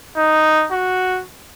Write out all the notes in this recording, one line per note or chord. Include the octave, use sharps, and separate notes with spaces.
D#4
F#4